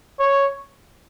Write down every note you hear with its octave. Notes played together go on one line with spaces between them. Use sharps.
C#5